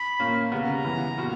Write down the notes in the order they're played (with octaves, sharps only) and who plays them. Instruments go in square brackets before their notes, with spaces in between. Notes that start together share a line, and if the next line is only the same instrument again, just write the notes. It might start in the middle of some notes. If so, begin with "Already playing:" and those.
Already playing: [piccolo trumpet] B5
[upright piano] A#2 A#3 C#4
[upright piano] C#3 G3 B3 [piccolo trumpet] A#5
[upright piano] C#3 E3 B3
A#2 G3 B3 F#4